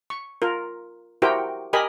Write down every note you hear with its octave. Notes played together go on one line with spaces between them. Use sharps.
C#6
F4 A#4
E4 F#4 G4 A#4 C5 G5
G4 A#4 D#5 G#5 B5